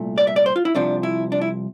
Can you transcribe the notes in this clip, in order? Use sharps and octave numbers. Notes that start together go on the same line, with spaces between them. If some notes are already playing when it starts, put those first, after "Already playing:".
Already playing: C2 A#2 A3
D5
E5
D5
C5
F4
E4
C2 C3 F3 D4
E4
D4
E4